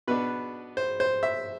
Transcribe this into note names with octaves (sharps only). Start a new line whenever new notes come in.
B2 B3 D4 B4
C5
C5
E5